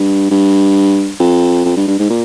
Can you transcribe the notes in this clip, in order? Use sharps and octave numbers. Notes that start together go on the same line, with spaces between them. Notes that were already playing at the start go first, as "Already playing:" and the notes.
Already playing: G2
G2
F2
F2
G2
G2
G#2
A#2